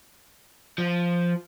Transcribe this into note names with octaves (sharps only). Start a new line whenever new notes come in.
F3